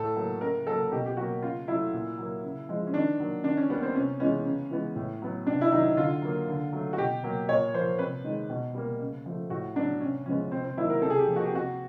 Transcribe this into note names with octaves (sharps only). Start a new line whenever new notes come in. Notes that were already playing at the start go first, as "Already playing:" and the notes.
Already playing: A2 A4
F#3 A#3
C#3 A#4
F#3 A#3 A4
B2 G4
G4
F#3 A#3 F#4
C#3 F4
F#3 A3 E4
A#2
F#3 A#3
C#3
F3 G#3
C#4
D#3 D4
F#3 A#3
D#3 D4
C#4
G3 A#3 B3
C4
C3 C#4
E3 G#3 B3 C#4
C#3
E3 G#3 B3
A2
F#3 B3
C3 D4
E4
D#3 F#3 D#4
D3 F4
F#3 A#3
D3
F#3 A3
F#4
B2 G4
F#3 A#3
A#2 C#5
F3 A#3 C5
C3 B4
D#3 G#3
B2
G3 A#3
C#3
F3 A3
A2 F#4
F#3 B3 D4
C3 C#4
F3 G#3 B3 C#4
C3 C4
C4
D#3 F#3 A#3 E4
A#4
C3 A4
G#4
G4
F3 A#3
F#4
G4
C3 F#4